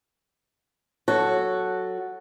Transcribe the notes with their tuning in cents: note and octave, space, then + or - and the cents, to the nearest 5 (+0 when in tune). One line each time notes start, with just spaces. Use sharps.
F#3 +0 F#4 +0 A4 +0